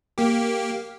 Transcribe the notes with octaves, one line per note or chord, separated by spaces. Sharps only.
A#3 G4